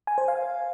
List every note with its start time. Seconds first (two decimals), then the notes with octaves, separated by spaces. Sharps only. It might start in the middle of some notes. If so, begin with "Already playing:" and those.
0.07 G#5
0.18 C5
0.28 F5